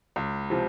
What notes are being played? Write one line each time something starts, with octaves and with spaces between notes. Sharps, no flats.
C#2
C3 F3